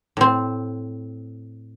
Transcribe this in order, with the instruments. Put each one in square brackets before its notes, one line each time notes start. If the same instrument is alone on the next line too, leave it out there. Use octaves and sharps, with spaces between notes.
[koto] A2 C4